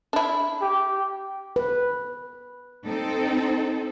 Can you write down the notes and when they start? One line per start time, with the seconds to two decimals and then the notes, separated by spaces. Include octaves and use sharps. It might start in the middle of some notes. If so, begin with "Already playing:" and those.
0.13 D4 E4
0.61 G4
1.56 B4
2.86 C4 D#4 A4